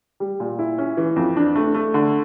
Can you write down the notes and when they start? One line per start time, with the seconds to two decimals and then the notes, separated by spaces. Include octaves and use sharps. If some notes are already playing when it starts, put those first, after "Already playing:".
0.20 G3
0.40 A#2
0.59 E4
0.78 C#4
0.97 E3
1.16 F2
1.37 D4
1.55 A3
1.74 A3
1.94 D3